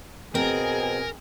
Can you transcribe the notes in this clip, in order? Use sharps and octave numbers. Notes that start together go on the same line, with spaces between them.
B2 C4 G#4 A#4